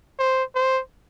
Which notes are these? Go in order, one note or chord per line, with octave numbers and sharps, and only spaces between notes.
C5
C5